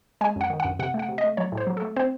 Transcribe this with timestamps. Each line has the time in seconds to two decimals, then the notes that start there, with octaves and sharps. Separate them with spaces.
0.21 G#3 G#5
0.36 F#2 F#5
0.50 D#3
0.60 F#5
0.65 F#2
0.79 C3 F#5
0.94 A3
0.99 F#5
1.09 C3
1.18 D#5
1.24 A3
1.37 F#3 C#5
1.52 A2
1.57 C5
1.67 F#3
1.77 A4
1.82 A3
1.96 C4 C5